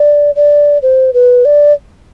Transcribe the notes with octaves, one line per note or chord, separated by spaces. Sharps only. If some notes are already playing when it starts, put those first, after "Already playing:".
Already playing: D5
D5
C5
B4
D5